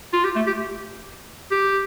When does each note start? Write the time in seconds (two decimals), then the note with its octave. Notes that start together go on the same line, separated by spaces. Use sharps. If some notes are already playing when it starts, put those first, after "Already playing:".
0.13 F4
0.24 G4
0.35 A3
0.47 G4
1.51 G4